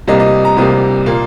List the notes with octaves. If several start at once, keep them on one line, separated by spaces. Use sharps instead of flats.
C2 C3 G3 A#3 D#5
D#5
A#5
C2 C3 G3 A#3 D#6
A#2 A#3